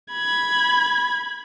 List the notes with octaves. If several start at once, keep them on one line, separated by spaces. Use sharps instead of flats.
B5 G#6